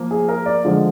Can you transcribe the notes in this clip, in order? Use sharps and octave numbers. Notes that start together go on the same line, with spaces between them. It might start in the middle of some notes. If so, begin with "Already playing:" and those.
Already playing: F3 A#3
G#4
A#4
D5
D3 F3 G#3